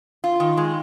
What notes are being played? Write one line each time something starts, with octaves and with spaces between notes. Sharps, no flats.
F4
D#3
G#3